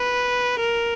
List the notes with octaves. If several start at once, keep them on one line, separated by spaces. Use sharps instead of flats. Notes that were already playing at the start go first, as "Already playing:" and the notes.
Already playing: B4
A#4